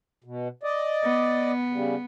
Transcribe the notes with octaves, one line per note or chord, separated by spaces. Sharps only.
B2
D5 D#5
B3
C#3 G3